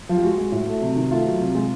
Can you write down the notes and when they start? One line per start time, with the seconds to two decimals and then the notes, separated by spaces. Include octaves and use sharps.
0.09 F3
0.17 G4
0.23 G#3 F#4
0.38 G#3
0.52 A2
0.67 A3
0.81 C3
0.96 D#3
1.11 A3 F4
1.25 F#3
1.40 C3
1.55 G#3